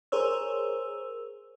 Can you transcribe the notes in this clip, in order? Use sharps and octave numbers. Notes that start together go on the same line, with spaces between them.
G#4 A#4 C5 C#5 E6